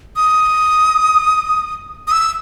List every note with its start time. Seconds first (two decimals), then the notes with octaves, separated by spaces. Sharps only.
0.16 D#6
2.07 D#6
2.12 E6